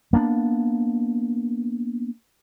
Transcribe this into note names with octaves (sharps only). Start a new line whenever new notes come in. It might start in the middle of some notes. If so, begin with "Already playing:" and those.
A#3 B3 C#4 D4